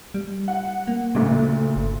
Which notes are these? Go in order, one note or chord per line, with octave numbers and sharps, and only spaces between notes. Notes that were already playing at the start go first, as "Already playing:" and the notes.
G3
F#5
A#3
D2 A#2 C#3
G1